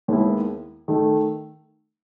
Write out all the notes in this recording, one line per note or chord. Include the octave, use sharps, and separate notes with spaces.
D#2 D#3 G#3 B3 E4
D#3 A3 D#4